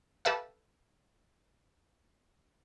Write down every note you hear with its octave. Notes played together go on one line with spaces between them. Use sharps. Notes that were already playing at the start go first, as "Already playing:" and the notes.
G4 A4 B4 E5 F5